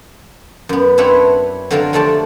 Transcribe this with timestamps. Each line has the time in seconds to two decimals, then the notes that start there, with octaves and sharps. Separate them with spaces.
0.69 F#2 B3
0.98 C4 D4 E4 B4 C#5 F#5
1.71 D3 F#3 C4 F4 A#4 F5
1.93 F2 C3 A3 D4 D5 A5